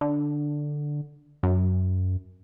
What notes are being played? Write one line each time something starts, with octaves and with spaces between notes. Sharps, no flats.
D3
F#2